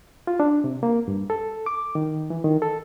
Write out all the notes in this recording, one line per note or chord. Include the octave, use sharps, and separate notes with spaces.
F4
D4
C3
A#3
G2
A4
D6
D#3
E3
D#3
A4